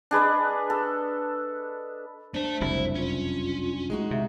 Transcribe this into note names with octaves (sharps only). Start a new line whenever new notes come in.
D4 G#4 B4 D#5
A4
A3 D4 C5 A5
F#1 C2 F2 E4
C#4 F4
G#3 A3 D#4 F#4
C3 E5